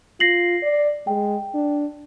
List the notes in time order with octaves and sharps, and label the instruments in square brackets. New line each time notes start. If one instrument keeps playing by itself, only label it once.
[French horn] F4 [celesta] A#6 C7 F#7
[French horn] D5
[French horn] G#3 [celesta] G5
[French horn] D4